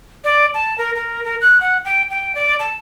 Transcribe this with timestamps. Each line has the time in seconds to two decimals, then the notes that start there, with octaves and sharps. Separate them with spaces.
0.24 D5
0.54 A5
0.78 A#4
0.95 A#4
1.24 A#4
1.41 F#6
1.61 F#5
1.85 G5
2.11 G5
2.35 D5
2.59 A5